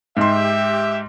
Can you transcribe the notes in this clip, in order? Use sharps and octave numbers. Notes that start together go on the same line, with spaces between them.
G#2 G4 E5 C6